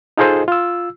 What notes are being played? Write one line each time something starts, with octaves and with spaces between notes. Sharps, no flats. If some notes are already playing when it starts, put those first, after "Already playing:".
D#4 F4 G#4 A4 C5 D#5
F4 E6